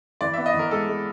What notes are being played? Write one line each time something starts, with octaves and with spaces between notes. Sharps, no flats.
E3 D5
B3 E5
D#5
E3
A#4
G#3 A4
G#3